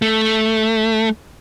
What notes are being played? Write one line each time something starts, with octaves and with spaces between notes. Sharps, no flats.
A3